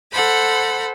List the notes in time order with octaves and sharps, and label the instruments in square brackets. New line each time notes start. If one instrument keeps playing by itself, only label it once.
[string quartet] A4 C5 F#5 B5